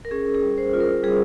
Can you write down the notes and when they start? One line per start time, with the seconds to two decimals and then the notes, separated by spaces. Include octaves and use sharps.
0.05 A#4
0.11 C#4 G#4
0.35 G#4
0.42 G3
0.58 C5
0.74 F4
0.80 A#4
1.03 G3 G#4